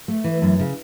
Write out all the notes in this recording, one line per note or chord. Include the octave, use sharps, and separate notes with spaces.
A3
E3
F#2
C#3